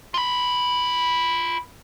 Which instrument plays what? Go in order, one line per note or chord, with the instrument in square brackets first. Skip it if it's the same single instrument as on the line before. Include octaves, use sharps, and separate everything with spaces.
[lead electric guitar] F4 B5